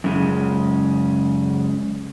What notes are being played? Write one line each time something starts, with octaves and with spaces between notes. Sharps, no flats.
F#2 C#3 G#3